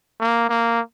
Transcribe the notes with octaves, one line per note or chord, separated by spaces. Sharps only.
A#3
A#3